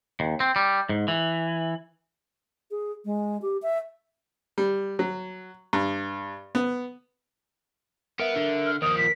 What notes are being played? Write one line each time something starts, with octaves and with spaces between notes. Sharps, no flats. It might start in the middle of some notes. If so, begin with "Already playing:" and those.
D#2
C4
G3
G#2
E3
G#4
G#3
G4
E5
G3
F#3
G2
B3
B3 A#4 E5
D3
F6
D#2 F3 A#4 D#6
B6